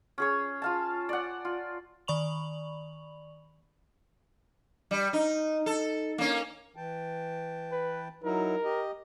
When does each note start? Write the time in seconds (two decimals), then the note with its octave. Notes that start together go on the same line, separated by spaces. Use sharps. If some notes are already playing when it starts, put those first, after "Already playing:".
0.18 C#4 G#4 C#5
0.62 F4 F5 A5
1.09 D5 F#5
1.45 F4
2.08 D#3 D5 B5 C#6 F7 F#7
4.91 G3
5.13 D#4
5.66 A4
6.18 A#3 C#4
6.76 E3 G5 A5
7.72 B4
8.24 F#3 D#4 E4 A#4
8.64 G4 D#5